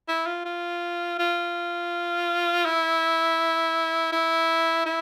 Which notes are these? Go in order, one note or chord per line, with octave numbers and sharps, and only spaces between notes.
E4
F4
F4
F4
E4
E4
E4